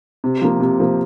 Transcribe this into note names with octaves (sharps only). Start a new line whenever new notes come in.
C3
F3 A#3
C3
F3 A#3